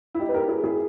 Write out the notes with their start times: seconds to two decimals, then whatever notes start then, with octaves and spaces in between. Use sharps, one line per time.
0.15 E4
0.19 D#4 G4
0.29 B4
0.34 G4 A#4
0.48 E4 G#4
0.63 E4 G#4